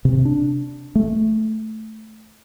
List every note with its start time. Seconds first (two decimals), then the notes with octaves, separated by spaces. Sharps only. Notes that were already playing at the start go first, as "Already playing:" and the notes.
0.05 C3
0.25 D4
0.95 A3